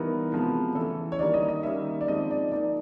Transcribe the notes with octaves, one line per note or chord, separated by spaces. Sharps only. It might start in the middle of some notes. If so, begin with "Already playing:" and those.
Already playing: E3 G3 B3 D#4 A#4
C3 F3 G#3 B3
E3 A3 C#4 A4
C#5
D#3 G3 A#3 D4 D5
D#5
D#5
D#3 G3 A#3 C#4 E5
D5
F3 G#3 C4 D#4 D#5
D5
F3 A#3 D#4 D5